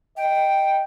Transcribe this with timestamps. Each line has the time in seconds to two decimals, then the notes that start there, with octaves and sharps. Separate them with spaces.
0.17 D#5 G5